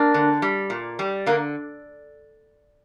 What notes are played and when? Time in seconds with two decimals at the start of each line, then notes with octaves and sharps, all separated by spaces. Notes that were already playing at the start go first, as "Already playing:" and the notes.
Already playing: A#3 D4
0.14 D3
0.42 G3
0.70 A#2
0.99 G3
1.26 D3 A#3